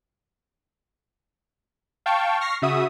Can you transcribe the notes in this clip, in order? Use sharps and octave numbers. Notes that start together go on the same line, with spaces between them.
F5 G5 A5 C#6
C#6 F6 A#6 C7
C#3 F#4 E5 D#6